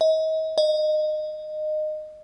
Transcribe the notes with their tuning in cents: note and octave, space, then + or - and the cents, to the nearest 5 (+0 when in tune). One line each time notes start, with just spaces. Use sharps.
D#5 +35
D#5 -20